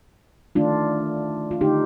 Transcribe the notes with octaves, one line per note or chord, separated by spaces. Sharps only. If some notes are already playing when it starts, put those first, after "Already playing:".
D#3 A3 D4 F4
F4
D3 A3 D#4 G4